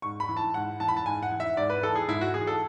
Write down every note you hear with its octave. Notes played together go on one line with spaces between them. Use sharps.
G#2 C#6
B5
E3
A5
G#2 F#5
E3 A5
B5
A5
G#2 G#5
F#5
E3
E5
G#2 D5
B4
E3 A4
G#4
G#2 E4
F#4
E3 G#4
A4